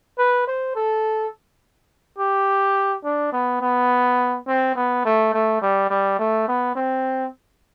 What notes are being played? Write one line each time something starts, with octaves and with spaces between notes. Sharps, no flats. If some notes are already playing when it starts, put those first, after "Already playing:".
B4
C5
A4
G4
D4
B3
B3
C4
B3
A3
A3
G3
G3
A3
B3
C4